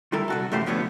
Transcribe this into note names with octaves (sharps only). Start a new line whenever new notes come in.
D2 D#3 G3 E4 A4 A#4
C2 F#4 A4
F#2 E3 A3 G4 C5 F5
C2 D3 F3 A3 B3 C#5